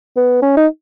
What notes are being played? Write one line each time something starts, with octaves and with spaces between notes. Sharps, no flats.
B3
C#4
D#4